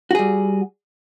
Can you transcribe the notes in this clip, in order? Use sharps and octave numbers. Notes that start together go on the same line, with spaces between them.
G3 F#4 G#4